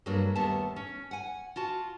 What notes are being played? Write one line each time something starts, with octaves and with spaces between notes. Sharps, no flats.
G2 F#3 A3 A#3 D4
D#2 G3 A3 B3 A5
C#4
F#5 G#5
F4 F#4 A5